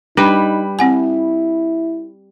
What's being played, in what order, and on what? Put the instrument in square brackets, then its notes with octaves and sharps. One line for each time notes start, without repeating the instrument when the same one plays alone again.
[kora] G3 B4 [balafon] D4 [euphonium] D#4
[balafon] C4 F#5 G#5 [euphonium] E4